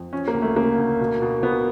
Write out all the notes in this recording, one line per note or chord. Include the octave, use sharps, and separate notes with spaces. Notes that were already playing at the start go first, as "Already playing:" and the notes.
Already playing: F2
F3 C#4
A#3
D2
A3
C#3 A#3
D2
B2
B2
B2 B3